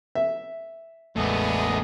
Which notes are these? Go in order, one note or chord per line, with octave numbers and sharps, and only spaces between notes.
E5
A1 E2 G#3 A3 B3 D4 G#4 D#5